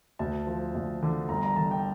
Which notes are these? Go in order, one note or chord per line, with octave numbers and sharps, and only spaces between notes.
D2 A5
F3
D2
D3
G1 A#5
A#5
D3 A5
G5